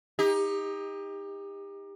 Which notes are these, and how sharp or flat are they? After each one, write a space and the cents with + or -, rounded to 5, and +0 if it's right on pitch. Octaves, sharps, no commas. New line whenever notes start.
D#4 +15 G4 +30